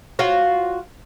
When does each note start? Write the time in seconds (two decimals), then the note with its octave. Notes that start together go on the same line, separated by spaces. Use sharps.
0.19 F4 F#4 C#5